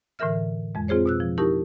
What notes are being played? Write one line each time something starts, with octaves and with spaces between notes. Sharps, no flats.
A2 D3 E3 A#4 E5 F6
F2 G#3
C4 F4 G#4 C5 C#5
B2 E6 F#6
F3
D#4 E4 G4 A#4 A5 C#6